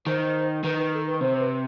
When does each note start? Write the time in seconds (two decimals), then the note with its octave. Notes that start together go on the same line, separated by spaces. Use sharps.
0.06 D#3 C5
0.64 D#3 B4
0.78 B4
0.93 A4
1.06 B4
1.20 C3 C5
1.40 B4